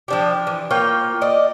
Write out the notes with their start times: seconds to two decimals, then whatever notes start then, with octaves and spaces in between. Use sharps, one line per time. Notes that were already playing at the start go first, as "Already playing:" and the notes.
0.08 F3 D4 G4
0.47 E3
0.71 A#3 F4 C#5 G5
1.22 D5 D#5